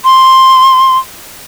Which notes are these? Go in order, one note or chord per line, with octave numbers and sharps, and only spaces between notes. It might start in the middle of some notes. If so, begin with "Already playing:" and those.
C6